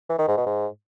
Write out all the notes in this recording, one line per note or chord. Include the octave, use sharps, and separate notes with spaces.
E3
D#3
G#2
B2
G#2